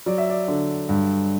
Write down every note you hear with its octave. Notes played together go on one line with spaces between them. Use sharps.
F#3 D5
E5
D5
D3
G2